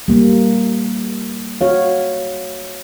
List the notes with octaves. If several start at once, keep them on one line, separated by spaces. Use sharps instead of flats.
G3 A#3
F#4 C#5 F5